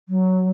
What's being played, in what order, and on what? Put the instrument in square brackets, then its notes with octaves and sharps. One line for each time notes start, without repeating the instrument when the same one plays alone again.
[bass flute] F#3